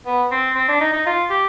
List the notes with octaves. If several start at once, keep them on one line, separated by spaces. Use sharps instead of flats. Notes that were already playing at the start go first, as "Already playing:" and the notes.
B3
C4
C4
D4
D#4
D#4
F4
G4